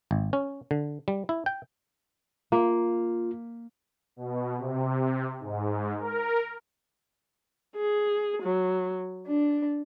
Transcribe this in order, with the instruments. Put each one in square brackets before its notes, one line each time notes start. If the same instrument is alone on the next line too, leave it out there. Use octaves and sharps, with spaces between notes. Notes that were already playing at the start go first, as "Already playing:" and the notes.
[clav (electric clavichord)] G#1
C#4
D3
G3
E4
G5
[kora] A#3 [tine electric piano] F4
[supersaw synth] B2
C3
G#2
A#4
[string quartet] G#4
F#3
D4